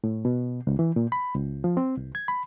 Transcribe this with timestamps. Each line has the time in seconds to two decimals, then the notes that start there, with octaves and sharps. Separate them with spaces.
0.04 A2
0.25 B2
0.67 C#2
0.79 E3
0.96 A#2
1.12 B5
1.34 C#2
1.64 F3
1.77 C4
1.97 C2
2.15 G#6
2.28 B5